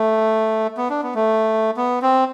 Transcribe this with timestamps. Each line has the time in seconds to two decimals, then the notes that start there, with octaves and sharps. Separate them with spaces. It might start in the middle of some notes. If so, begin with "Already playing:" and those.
Already playing: A3
0.77 B3
0.90 D4
1.03 B3
1.15 A3
1.77 B3
2.02 C4